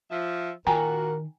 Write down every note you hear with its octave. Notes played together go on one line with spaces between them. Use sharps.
F3 E5
A#2 D#3 F#4 A#4 G5 G#5 A#5